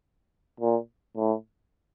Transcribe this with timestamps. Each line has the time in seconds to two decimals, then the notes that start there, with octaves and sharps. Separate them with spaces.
0.60 A#2
1.16 A2